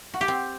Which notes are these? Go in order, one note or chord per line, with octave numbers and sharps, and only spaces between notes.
F#4
G4
C4